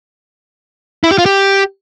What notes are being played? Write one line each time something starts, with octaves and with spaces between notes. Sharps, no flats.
E4
G4
F4
G4